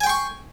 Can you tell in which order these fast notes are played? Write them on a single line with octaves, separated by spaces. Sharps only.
G#5 G5 C6 C#6